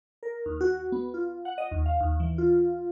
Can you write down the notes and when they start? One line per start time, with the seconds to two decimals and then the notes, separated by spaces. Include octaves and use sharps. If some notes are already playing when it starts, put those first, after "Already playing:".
0.23 A#4
0.46 D#2
0.61 F#4
0.92 B3
1.14 F4
1.45 F#5
1.58 D#5
1.71 D#2
1.86 F5
2.00 D#2
2.20 E3
2.38 F4